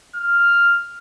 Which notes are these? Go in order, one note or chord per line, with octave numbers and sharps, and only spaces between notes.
F6